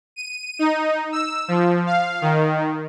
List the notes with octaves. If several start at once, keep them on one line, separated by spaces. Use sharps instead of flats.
D#7
D#4
E6
F3
F5
D#3